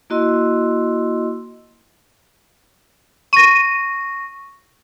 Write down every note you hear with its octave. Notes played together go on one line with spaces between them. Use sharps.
A#3 E4 F#4 D#5 C6 E6
C#6 A#6 D#7